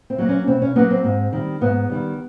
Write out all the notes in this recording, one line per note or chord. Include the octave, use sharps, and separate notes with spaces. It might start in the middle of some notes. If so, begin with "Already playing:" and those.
C4
F#3 A#3
C#4
B2 C4
C#4
F#3 A#3 B3
C4
G#2
D#3 G3
G#2 B3
D#3 G3